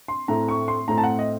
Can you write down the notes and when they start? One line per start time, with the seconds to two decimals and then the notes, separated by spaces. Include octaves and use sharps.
0.08 C6
0.28 A2 A3 C4 A#5
0.49 C#6
0.68 C6
0.88 A2 A3 C4 A#5
0.98 A5
1.03 F#5
1.19 D#5